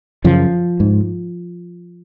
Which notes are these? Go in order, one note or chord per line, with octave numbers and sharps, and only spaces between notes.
F#2 C#3 F3
G#2